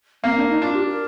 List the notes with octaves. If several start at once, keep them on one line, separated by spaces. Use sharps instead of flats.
A#3 C4
D4
D#4
D4 F4
G4
A#4